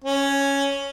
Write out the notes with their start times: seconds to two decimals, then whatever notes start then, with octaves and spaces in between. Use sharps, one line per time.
0.04 C#4